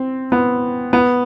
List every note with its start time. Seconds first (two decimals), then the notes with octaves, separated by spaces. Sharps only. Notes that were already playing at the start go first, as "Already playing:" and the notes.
Already playing: C4
0.32 B3
0.93 B3